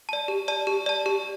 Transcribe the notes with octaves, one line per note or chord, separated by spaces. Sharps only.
D5 A5
G4
D5 A5
G4
D5 A5
G4